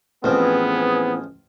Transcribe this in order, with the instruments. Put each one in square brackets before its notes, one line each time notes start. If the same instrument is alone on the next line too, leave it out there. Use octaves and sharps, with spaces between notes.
[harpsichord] A1 F3 [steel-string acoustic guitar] E3 C4 [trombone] B3 [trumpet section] G#4 D#6